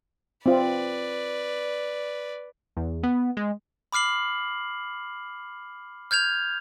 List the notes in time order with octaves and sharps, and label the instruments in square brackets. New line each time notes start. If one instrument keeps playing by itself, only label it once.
[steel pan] C4 F4 [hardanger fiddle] B4 D5
[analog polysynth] E2
B3
G#3
[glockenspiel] B5 D6 F6 C7 F#7
F6 G6 G#6 F7